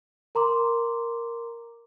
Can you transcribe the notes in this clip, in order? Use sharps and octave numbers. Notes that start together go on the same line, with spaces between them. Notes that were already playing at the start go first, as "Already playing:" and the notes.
A#4 A#5 C6 D6